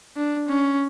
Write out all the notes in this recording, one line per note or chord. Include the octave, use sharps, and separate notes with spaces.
D4
C#4